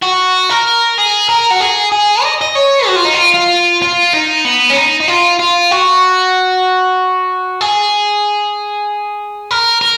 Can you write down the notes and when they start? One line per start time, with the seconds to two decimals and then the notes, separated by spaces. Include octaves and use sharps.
0.03 F#4
0.50 A#4
0.98 G#4
1.29 A#4
1.51 F#4
1.61 G#4
1.92 G#4
2.23 D#5
2.42 D#5
2.55 C#5
2.87 F#4
2.96 F4
3.05 D#4
3.14 F4
3.34 F4
3.82 F4
4.13 D#4
4.45 B3
4.70 C#4
4.77 D#4
5.00 D#4
5.08 F4
5.40 F4
5.71 F#4
7.61 G#4
9.51 A#4
9.81 A#4